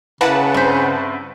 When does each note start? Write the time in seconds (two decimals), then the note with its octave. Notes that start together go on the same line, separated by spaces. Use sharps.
0.21 C#3 A#3 E4 B4 F#5 A5
0.54 G2 E3 C4 C5 B6